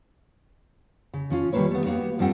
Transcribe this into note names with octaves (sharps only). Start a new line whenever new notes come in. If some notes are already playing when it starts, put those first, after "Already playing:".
C#3
F3 C#4 F4
D#3 G3 G#3 A#3 B4 C#5
A3 B3
A#3 B3 F#4 G4
G2 F3 G3 A3 C4 F#5